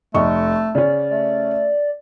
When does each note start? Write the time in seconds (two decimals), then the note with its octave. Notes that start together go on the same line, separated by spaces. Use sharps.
0.14 F1 A3 D#5 C#6
0.75 C#3 C#4 D5
1.10 A3 D5